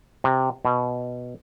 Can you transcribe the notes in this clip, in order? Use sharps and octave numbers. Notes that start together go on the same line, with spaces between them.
C3
B2